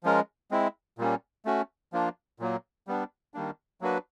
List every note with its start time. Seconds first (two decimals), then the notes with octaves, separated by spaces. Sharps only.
0.03 F3 G#3 C#4 F4 A#4
0.51 G#3 C4 E4
0.98 A#2 G3 A#3 C#4
1.45 A3 C#4 F#4
1.93 F3 A#3 D4 F4
2.39 A#2 F#3 A#3
2.87 G3 B3 D4
3.34 D#3 G3 A#3 D4
3.81 F#3 A#3 D4 F#4 B4